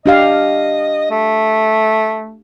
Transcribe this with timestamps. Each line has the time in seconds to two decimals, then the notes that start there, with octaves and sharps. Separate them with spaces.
0.06 D4 G4 D#5 F5
1.11 A3